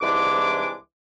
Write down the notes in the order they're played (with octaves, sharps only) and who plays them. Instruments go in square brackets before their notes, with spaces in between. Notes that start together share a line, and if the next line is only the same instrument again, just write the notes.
[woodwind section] C2 G#2 E3 G#3 D4 D6